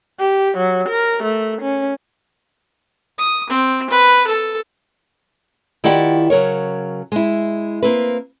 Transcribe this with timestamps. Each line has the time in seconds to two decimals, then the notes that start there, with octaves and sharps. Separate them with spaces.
0.20 G4
0.58 F#3
0.89 A#4
1.23 A3
1.62 C#4
3.18 D#6
3.49 C4
3.90 B4
4.27 A4
5.84 D#3 E4 F4 G4 D5 F#5
6.30 C#3 F#3 A#4 C#5
7.12 G#3 E4
7.82 A#3 C4 B4